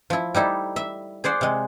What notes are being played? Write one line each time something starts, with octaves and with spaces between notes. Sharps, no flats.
F3 E4
G3 D#4 E4 A4
E5
G#4 C5 D5 F#5
C3 G#3